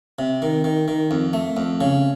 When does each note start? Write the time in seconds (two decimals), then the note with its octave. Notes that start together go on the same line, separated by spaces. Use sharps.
0.19 C3
0.42 D#3
0.64 D#3
0.88 D#3
1.11 F2
1.33 A3
1.57 F2
1.81 C#3